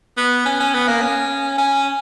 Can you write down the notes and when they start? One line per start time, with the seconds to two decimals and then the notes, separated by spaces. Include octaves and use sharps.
0.17 B3
0.46 C#4
0.60 C#4
0.74 B3
0.88 A#3
1.02 C#4
1.58 C#4